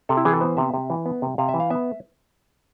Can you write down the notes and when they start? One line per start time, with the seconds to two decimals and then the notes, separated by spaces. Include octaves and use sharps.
0.09 C3 A4
0.17 E4
0.25 E3 G#4
0.34 A4
0.41 B3 C5
0.57 C3 E5
0.74 C3
0.90 E3
1.06 B3
1.22 C3
1.38 C3 F5
1.49 E5
1.54 E3
1.60 F5
1.70 B3 E5